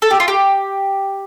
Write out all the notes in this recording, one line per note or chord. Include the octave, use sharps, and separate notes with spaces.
A4
G4
F4
G4